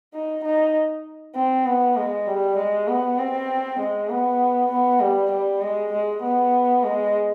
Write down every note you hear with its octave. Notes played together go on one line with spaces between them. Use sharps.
D#4
D#4
C4
B3
G#3
G3
G#3
B3
C4
G#3
B3
B3
G3
G3
G#3
G#3
B3
G#3